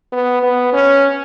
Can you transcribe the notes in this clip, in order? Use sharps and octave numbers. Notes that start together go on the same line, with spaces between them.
B3
B3
C#4